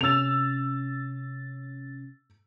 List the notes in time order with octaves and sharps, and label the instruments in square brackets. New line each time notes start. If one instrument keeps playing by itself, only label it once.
[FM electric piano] C3 C#4 A6 [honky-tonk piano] E6 F7